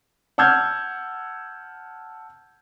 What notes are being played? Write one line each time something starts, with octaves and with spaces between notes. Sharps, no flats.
F#5 A5 E6 F6 G6 G#6